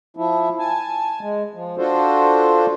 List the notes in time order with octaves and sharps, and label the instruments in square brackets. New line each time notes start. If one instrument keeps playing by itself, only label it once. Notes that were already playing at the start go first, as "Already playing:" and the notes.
[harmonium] F3 E4
G#5 A5
G#3
F3
D4 F4 F#4 A4 C5